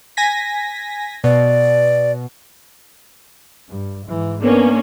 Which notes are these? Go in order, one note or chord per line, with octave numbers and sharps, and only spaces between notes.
G#5 A#6 B6
B2 D5
G2
G#2 E3
A#3 B3 C#4 D4